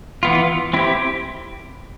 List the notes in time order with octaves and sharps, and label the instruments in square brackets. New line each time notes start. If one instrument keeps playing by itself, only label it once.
[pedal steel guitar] E3 B3 F4
C4 E4 G4